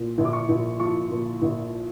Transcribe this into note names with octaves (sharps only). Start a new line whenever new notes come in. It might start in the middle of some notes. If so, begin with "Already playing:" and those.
Already playing: A#2
A#1
D6
C#6
A#1
F3 C#6
A#2
A#1